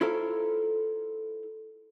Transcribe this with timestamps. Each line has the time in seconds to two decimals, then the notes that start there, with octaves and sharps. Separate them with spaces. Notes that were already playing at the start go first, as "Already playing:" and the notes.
0.01 E4 F4 A4 A#4 C5 F5